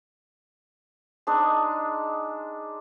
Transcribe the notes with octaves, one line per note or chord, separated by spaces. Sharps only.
G#3 D4 D#4